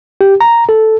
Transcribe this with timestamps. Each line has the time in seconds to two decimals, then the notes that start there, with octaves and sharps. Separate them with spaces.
0.21 G4
0.41 A#5
0.69 A4